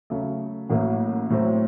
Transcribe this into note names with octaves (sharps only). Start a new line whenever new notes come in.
C#3 F#3 A3
A1 A2 F#3 A#3
A2 F#3 C4